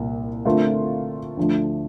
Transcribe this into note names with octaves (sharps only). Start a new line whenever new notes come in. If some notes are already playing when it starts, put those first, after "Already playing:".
Already playing: C2 A#2
D3 A3 C4 F4 A#4
D2 D3 F3 A3